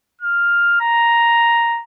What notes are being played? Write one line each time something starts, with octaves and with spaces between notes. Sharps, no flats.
F6
A#5